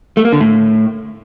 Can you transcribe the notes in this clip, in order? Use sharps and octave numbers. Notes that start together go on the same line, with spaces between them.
A3
A#3
D3
A2